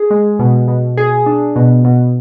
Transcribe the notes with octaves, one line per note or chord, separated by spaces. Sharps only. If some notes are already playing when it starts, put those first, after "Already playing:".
Already playing: G#4
G#3
B2
B2
G#4
D4
B2
B2